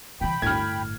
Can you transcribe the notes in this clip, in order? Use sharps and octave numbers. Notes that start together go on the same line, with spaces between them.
C#3 E3 G5 B5
G1 D2 A2 F6 G#6